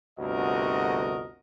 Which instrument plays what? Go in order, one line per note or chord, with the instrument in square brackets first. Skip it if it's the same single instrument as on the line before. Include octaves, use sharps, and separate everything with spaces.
[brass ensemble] G1 D2 C3 F#4 A#4 D#5